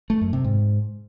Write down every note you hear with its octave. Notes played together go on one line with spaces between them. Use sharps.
A3
F#2
C3
G#2